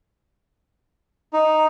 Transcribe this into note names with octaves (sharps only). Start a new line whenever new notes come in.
D#4